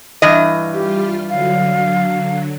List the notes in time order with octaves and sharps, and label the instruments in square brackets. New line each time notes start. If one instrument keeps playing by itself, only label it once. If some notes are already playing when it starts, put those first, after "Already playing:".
[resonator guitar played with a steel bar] G2 E3 D#5
[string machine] G3 F4 F6 [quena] G4
[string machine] D3 F#3 [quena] F5